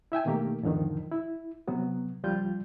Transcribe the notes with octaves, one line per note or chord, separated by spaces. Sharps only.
E4 E5 G5 G#5
B2 D#3 A3 A#3 G4
E2 G#2 D3 D#3 F3
E4
C3 F#3 B3
C#2 F3 G3 F4 G6